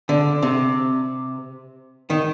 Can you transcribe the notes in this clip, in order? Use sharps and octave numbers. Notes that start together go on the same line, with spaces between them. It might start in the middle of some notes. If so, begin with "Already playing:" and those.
D3
C3
D#3